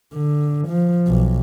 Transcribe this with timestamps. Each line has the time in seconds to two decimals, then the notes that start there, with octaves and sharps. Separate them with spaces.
0.13 D3
0.68 F3
1.07 B1